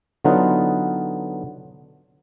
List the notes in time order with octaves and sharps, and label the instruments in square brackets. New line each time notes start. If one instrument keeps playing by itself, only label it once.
[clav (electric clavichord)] D3 F#3 B3 D#4 F4 B4